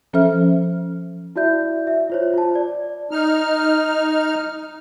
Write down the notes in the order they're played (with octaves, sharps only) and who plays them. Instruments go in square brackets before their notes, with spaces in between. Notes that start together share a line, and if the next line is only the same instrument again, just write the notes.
[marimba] F3 C#4 A4 C5 E5 F6
[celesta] E4 F#4 D5 E5 G6
E5
F4 C5 C#5
F4 A5
D5
[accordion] D#4 F6